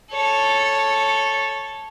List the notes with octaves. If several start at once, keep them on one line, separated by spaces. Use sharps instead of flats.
A4 C#5